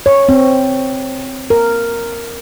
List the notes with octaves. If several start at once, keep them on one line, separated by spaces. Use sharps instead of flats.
C#5
C4
A#4